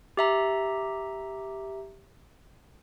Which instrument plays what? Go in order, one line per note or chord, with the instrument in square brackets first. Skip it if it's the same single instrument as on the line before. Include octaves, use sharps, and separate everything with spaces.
[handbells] G4 E5 A#5